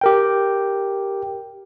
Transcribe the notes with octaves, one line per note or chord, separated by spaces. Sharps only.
G4 A#4 G5